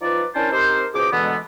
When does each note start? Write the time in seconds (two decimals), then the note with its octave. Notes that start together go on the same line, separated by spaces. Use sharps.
0.02 F3 D#4 F4 B4 D5
0.35 C#4 D4 E4 A#4 C5 A5
0.52 C4 D#4 G4 A#4 C5
0.94 C#2 B2 G#4 C5 D#5 D6
1.13 B2 D3 E3 G#3 A3 B3